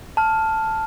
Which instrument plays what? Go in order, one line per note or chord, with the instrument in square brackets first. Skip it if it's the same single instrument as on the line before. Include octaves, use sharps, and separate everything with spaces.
[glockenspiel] A5 F6